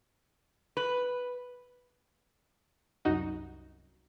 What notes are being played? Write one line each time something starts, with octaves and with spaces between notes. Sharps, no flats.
B4
C2 F#2 D#4 F#4